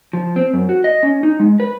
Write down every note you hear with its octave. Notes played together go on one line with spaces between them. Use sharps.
F3
C4
F#2
F#4
D#5
C#4
D#4
G#3
B4